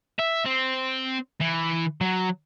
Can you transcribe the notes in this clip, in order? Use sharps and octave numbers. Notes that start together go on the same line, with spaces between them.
E5
C4
E3
F#3